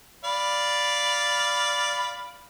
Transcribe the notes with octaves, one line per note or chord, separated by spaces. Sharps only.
D5 F5 B5